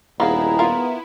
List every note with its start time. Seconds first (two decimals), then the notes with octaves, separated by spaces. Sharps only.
0.20 D#1 B3 D#4 E4 G#4 F5 A#5
0.59 B3 E4 F4 A#4